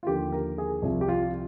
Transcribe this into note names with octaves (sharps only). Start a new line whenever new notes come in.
F4
D#2 D3 F3 G4
A#4
G#4
C2 C3 F3
G4
F4